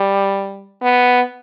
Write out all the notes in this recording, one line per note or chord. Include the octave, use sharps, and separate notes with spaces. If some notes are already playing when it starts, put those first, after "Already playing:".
Already playing: G3
B3